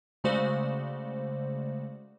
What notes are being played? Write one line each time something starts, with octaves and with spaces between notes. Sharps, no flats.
C#3 G#3 A3 F#4 C5 D5